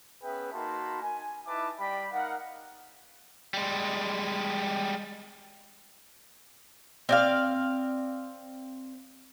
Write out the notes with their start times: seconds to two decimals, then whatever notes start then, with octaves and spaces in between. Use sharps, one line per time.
0.23 B3 C#4 G#4 B4 E5 G5
0.53 A#3 D#4 F#4 A5 B5 C6
1.02 G#5
1.47 D#4 E4 B4 E5 A5 D6
1.79 G3 D5 G5 B5
2.12 D#4 A#4 F5 F#5
3.54 G3 G#3
7.09 C4 D5 F5